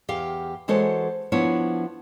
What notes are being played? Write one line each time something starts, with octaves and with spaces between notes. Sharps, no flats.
E2 G4 F5 G5
E3 G#3 F#4 A4 C5 C#5
F3 B3 D4 E4 C#5